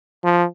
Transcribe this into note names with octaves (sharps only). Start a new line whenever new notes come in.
F3